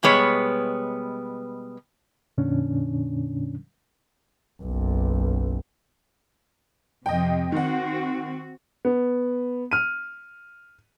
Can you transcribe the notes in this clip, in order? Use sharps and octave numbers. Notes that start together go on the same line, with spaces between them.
B2 G3 G#3 B3 C#5
F2 A#2 D3 C#4 D4
F#1 B1
F2 C3 D#5 G5
D#3 C4 F#4 F#5
B3
F6 D#7